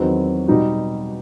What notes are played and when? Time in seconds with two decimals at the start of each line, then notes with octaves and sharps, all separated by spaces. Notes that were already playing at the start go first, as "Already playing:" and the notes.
Already playing: E2 D#3 F#3 C4
0.47 B2 G3 D#4 F#4